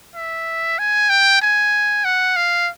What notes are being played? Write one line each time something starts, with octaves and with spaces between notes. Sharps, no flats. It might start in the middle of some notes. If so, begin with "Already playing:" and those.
E5
G#5
G5
G#5
F#5
F5